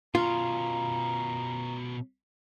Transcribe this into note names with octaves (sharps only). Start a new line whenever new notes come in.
B2 C#4 F4 A#5